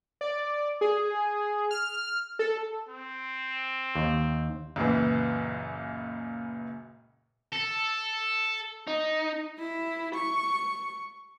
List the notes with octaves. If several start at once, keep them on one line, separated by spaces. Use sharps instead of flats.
D5
G#4
F6
A4
C4
D#2
C#2 F#2 A#2 E3
A4
D#4
E4
C#6